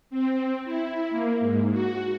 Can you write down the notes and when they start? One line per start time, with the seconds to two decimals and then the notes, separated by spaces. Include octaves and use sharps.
0.10 C4
0.65 E4
1.11 A#3
1.40 G#2
1.72 F#4